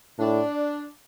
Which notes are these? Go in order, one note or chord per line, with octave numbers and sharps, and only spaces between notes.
A2 D4